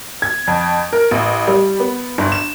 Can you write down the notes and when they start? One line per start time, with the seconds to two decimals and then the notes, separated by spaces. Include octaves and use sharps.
0.22 G#6
0.47 F2
0.93 A#4
1.11 A1
1.47 G3
1.80 B3
2.18 G1
2.32 E7